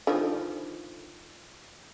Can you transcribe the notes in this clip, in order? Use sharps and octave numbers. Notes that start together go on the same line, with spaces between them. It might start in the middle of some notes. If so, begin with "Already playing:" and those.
D3 D#3 F3